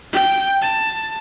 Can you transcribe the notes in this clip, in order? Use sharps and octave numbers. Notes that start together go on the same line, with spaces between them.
G5
A5